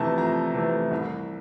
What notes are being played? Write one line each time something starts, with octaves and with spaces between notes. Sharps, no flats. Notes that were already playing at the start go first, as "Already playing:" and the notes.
Already playing: F2 C3 E3 A3 A5 A#5
F2 A#5
C3 E3 A3
C2